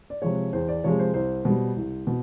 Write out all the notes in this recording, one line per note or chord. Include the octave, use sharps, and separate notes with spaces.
D5
C3 F3 G#3 C#5
E2 C5
D5
C3 F3 G#3 C#5
C5
C2 C5
B2 G3
C2
B2